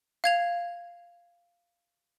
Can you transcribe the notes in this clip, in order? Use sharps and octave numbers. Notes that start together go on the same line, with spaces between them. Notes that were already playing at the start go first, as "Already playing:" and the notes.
F5 G#6 F7